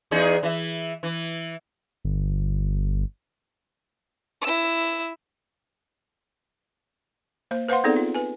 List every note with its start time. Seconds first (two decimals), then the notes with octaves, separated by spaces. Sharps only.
0.11 E2 D#4 G#4
0.43 E3 E5
1.03 E3
2.04 G1
4.42 E4 E6
7.51 A#3 C5
7.69 B4 C5 F5 F#5 C6
7.84 B3 C4 D#4 G#4 A4 D5
7.96 F4
8.14 B4 G#5